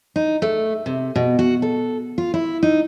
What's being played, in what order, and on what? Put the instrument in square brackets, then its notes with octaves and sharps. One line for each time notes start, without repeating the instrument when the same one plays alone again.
[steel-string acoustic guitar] D#4
A3
C3
B2
F#4
A4
F4
E4
D#4